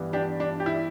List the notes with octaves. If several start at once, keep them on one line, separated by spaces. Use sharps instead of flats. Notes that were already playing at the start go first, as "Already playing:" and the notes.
Already playing: G2 E3 G3 B3
D4 G4
D4
G4
E4